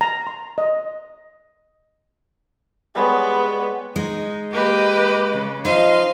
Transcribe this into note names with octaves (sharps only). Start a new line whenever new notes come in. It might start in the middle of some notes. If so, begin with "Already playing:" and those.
A#5
C6
D#5
G3 G#3 B3 C#5
G#3 D#4
A#3 G4 B4 D#5 D6
C#3
F3 D#4 D#5 F5 C6